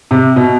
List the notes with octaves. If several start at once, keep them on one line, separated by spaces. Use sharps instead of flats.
C3
B2